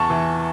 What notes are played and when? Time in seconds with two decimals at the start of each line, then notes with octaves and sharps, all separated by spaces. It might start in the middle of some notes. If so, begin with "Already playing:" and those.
Already playing: E2 A5 C#6
0.10 E3